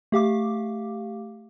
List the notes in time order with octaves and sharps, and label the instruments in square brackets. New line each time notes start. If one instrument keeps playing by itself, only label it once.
[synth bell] A3 G4 F5 D6